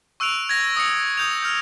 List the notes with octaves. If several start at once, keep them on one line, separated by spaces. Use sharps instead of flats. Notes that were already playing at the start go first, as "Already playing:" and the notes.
C#6 E6 F#6 D7 F7
G#6 A#6 F7
D#6 C#7
D#6 G6 F7
F6 G6